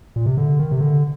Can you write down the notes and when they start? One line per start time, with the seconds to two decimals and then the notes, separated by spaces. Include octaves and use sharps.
0.16 A#2
0.26 C3
0.37 D3
0.59 D#3
0.72 C3
0.81 D3